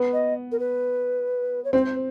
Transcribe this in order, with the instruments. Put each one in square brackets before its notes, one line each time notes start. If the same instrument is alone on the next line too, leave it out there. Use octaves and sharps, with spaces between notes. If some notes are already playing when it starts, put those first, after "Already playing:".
Already playing: [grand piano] B3
[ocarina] D#5
A#4
B4
C#5
[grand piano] C4 [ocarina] C5